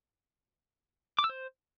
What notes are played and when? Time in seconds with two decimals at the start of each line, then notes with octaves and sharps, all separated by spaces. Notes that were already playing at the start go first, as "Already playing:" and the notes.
1.19 D6
1.24 E6
1.29 C5